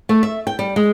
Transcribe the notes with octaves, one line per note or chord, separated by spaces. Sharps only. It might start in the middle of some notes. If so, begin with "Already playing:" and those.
A3
E5
G5
G3
G#3